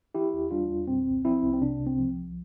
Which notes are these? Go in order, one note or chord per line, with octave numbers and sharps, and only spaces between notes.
E3 E4 G4
E2
G3 D4 F4
E2
A#2 C4
C2
F3 C4 E4
C2
C4
C3 D4
C2
C4
F3
C2